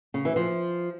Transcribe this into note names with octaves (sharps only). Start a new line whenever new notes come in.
C#3
E3
F3